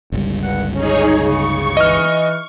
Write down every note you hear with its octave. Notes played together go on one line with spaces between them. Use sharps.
G1 C#2 G3
G2 F#5
C#4 D#4 G#4 C#5
C#3 C#6
E3 D#5 F6